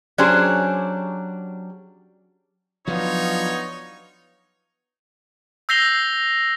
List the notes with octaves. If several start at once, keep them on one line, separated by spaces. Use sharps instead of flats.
F#3 C#4 D4 G4 G#4 C5
F3 F#3 B3 D4 D#4 F4 C#5
E6 G6 A#6 C7 F7 G7